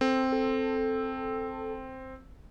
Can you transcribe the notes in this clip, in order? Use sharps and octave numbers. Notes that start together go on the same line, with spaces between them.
C4 A4
A4